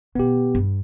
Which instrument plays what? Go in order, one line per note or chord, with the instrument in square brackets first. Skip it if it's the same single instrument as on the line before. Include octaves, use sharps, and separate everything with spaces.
[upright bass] B2 D#3 [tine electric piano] B3 G4
[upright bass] G2 D4